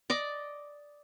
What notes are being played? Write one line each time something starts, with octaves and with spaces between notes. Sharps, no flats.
D5 D#5 D6